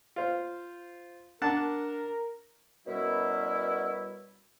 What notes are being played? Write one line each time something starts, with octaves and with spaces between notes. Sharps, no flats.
F4 C5
D4 A#4 F#5 A5
F#2 B2 G3 E4